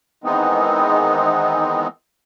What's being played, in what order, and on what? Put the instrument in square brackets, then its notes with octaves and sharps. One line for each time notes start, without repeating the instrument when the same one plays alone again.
[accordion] D#3 E3 G#3 B3 C4 D#4